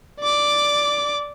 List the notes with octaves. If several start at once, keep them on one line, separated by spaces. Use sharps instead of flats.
D5 D6